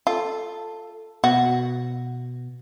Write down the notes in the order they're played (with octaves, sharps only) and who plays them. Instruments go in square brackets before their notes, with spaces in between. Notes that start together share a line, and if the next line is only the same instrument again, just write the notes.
[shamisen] F4 [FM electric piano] A4
[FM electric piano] B2 [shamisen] F#4